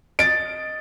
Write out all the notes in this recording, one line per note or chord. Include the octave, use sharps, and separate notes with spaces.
D#5 A6 D7